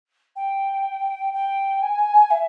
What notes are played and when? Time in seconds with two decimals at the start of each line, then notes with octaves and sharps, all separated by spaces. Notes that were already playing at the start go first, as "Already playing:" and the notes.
0.36 G5
1.33 G5
1.82 G#5
2.31 E5